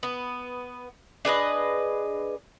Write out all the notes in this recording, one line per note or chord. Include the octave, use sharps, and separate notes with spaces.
B3
D4 G#4 B4 D#5